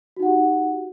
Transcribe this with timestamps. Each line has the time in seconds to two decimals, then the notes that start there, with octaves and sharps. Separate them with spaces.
0.17 F#4
0.19 D#4
0.22 F#5
0.25 G4